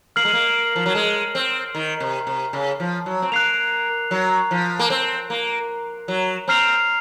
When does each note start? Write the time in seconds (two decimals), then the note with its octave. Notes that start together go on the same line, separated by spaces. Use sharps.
0.16 A#3 F6 C7 F#7
0.25 G#3
0.33 A#3
0.76 F3
0.86 F#3
0.95 G#3
1.35 C4
1.75 D#3
2.00 C3
2.27 C3
2.53 C#3
2.80 F3
3.06 F#3
3.22 C4
3.32 A#3 F#6 C7 F7
4.11 F#3
4.51 F3
4.79 A#3
4.90 C4
5.30 A#3
6.08 F#3
6.48 C4 A#5 F6 C7 F7